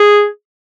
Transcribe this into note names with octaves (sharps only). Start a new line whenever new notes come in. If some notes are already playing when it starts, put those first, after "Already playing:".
Already playing: G#4